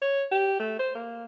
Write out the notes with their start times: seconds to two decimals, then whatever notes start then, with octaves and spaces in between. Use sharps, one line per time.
0.02 C#5
0.31 G4
0.60 A3
0.79 C5
0.95 A#3